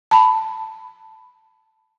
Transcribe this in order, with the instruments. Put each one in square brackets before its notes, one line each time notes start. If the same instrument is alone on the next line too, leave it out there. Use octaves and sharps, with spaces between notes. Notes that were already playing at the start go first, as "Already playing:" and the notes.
[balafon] A5 B5